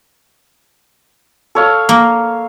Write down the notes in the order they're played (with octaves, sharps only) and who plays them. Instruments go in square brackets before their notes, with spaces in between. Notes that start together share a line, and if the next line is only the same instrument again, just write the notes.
[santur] A4 C#5 F5
[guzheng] A#3